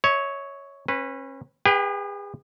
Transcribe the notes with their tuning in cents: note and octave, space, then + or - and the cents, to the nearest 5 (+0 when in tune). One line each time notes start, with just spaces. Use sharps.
C#5 +0 E5 -40
C#4 -35 B4 +0
G#4 -40 B4 +0 G5 +0